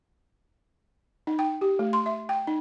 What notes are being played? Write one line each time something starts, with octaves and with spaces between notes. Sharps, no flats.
D#4
G5
G4
A3
C6
E5
G5
D#4